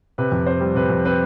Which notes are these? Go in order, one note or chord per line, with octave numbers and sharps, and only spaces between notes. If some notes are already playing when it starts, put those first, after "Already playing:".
C3 B4
F2
C4 C5
G3
C3 B4
F2
C4 B4